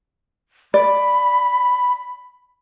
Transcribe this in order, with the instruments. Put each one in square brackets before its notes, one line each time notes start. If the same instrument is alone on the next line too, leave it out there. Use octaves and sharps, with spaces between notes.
[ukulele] D5 [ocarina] B5